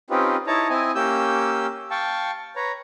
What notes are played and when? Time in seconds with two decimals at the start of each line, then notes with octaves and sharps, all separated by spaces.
0.10 C4 C#4 D#4 F4 G4 B4
0.47 D#4 E4 C#5 A5 A#5
0.70 C4 E4 D#5 G#5
0.95 A#3 C#4 G4 E6 G6
1.91 F5 G5 A5 C#6
2.56 B4 C#5 A#5